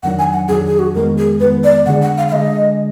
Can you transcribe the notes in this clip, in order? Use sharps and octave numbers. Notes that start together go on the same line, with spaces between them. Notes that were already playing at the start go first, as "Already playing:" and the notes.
F2 D#3 F#3 D4 F#5
G#5
F#5
F2 D#3 F#3 D4 G#4
G#4
F#4
F2 D#3 G#3 B3 A#4
G#4
F2 D#3 G#3 B3 B4
D5
D3 G#3 D4 G#4 F#5
F#5
F5
F5
D3 G#3 D4 G#4 D#5